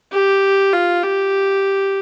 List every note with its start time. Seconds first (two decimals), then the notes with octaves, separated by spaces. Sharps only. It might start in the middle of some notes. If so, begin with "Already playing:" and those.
0.12 G4
0.72 F4
1.02 G4